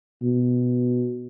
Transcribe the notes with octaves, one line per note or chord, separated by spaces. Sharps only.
B2